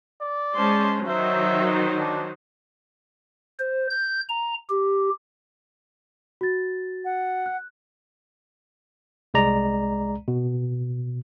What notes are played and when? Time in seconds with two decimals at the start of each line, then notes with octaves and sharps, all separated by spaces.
0.21 D5
0.56 G#3 C#4 C5 A5 C6
1.07 D#3 F#3 D#4 C5 E5
2.00 D4
3.59 C5
3.90 G6
4.29 A#5
4.69 G4
6.41 F#4 A6
7.05 F#5
7.46 F#6
9.34 C2 G#3 D5 A#5
10.28 B2